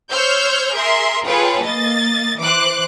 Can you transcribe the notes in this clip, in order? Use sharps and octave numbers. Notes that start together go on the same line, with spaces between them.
C5 C#5 E6 F6 G6
G#4 A#4 E5 C6
F4 G#4 A4 B4 C#5 G5
A#3 D#5 A6
E3 C5 D6 F#6